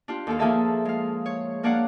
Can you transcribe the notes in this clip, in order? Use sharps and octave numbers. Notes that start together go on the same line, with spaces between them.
D4 F4 G4
D#2 A4 F5
F3 A#3 G#4 A4 E5 A5
G#3 F5
C#5
A#3 D4 C#5 D5 F5 F#5